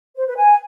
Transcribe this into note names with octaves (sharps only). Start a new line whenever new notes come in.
C5
B4
G#5